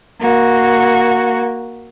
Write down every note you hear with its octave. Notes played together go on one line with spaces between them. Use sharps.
A#3 F#4